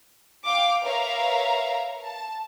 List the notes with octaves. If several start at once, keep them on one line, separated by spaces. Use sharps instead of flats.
F5 G5 D6
A#4 B4 C#5 E5 F5 A#5
A5